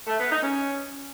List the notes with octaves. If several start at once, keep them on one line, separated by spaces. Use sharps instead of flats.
A3
B3
D#4
C#4